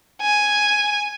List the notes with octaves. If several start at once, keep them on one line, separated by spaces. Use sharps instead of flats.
G#5